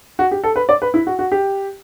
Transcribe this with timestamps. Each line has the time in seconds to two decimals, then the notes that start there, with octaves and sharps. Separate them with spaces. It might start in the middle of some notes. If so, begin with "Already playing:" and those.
0.19 F#4
0.31 G4
0.44 A4
0.56 B4
0.69 D5
0.82 B4
0.94 E4
1.07 F#4
1.19 F#4
1.32 G4